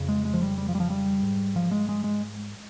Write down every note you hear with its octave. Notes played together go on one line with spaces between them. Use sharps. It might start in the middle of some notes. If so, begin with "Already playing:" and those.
Already playing: F2 C#3
G#3
G#3
F3
G3
G3
F3
G3
F3
G3
G#2
F3
G#3
G#3
G#3